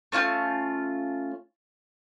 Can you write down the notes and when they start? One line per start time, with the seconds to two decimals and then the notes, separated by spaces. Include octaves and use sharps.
0.12 A3 C#4 F4 G6